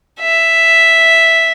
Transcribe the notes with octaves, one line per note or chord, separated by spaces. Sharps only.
E5